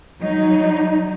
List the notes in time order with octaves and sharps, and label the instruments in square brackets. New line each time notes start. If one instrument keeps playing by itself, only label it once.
[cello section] F#3 D#4